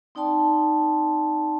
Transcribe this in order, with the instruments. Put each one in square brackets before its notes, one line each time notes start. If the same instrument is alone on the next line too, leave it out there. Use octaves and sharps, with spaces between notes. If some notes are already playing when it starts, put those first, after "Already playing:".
[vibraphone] C4 D#4 D5 G5 A5 C6